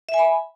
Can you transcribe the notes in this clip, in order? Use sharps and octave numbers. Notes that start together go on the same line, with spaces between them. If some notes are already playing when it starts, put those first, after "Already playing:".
E5
G#5
B5